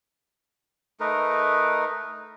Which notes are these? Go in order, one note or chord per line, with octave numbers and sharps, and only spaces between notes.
A3 D#4 A#4 B4